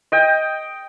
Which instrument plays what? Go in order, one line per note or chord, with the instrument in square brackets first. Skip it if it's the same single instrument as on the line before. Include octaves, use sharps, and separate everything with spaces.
[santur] D#5 G5